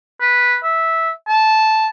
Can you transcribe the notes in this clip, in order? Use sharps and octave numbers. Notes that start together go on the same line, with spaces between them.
B4
E5
A5